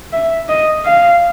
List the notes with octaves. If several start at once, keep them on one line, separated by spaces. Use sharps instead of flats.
E5
D#5
F5